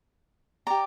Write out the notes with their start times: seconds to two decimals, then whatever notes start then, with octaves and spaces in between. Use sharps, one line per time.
0.67 G4 D5 A#5